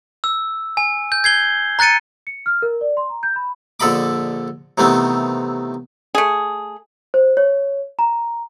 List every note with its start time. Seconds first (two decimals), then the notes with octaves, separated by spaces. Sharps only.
0.24 E6
0.77 G#5
1.12 G6
1.24 G#6 C7 G7
1.79 A#5 F#6 A6 C#7 D#7
2.27 C#7
2.46 F6
2.62 A#4
2.81 D5
2.97 C6
3.09 A#5
3.23 G6
3.36 B5
3.80 A#1 D3 A4 D#5 B5 D6
4.78 C3 D#3 E3 A3 B3 C4
6.15 A3 G#4
7.14 C5
7.37 C#5
7.99 A#5